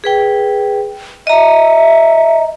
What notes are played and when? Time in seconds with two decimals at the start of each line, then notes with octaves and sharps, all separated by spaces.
0.04 G#4 B4 G5
1.27 D#5 E5 A#5